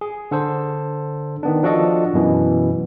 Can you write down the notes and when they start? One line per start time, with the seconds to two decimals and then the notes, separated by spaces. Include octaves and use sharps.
0.01 G#4
0.31 D3 A4 C5
1.43 D#3 B3 D4
1.63 F3 D4 F#4 A4 D#5
2.14 F#2 B2 E3